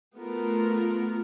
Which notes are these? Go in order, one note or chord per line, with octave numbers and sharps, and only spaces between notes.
A3 B3 F4 F#4 A#4